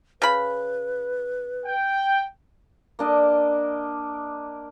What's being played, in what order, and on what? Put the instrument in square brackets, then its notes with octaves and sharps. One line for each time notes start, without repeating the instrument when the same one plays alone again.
[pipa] C#3 B5 [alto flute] B4
[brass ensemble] G5
[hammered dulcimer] A#3 D4 D#5